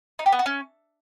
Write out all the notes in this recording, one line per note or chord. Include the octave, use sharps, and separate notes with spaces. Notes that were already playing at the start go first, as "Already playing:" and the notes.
D#4
G4
B3
F#4
C#4